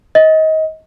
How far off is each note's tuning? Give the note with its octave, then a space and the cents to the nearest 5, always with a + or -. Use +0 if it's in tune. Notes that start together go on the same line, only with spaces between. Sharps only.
D#5 +25